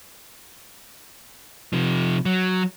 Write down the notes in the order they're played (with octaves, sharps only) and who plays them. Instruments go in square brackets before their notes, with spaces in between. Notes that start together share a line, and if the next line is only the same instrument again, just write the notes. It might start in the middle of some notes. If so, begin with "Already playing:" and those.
[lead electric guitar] C3 F3
F#3